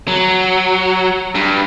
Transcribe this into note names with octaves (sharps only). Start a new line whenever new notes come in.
F#3
G2